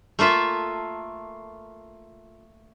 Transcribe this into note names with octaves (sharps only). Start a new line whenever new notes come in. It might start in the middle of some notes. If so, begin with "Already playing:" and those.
A3 A#3 F4 E5 A5